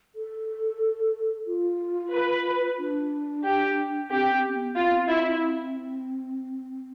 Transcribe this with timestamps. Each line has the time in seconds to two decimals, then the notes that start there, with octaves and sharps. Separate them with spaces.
0.15 A4
1.47 F4
2.13 B4
2.79 D4
3.44 G4
4.10 C4 G4
4.32 C4
4.48 C4
4.54 B3
4.76 C4 F4
5.09 E4